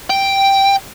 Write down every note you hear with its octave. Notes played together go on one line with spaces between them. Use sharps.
G5